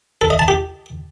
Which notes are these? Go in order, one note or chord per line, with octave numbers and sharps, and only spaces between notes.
A4
D#5
A5
G4